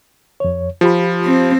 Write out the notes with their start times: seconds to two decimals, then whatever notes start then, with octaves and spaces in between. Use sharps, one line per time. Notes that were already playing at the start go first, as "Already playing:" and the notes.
0.40 F2 C#5
0.81 F3 F4 G4 B5
1.25 C4